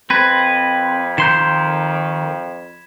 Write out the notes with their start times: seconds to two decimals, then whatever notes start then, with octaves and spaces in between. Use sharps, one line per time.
0.10 F2 C4 B4 B5 G#6 B6
1.18 D#3 C6 G6 E7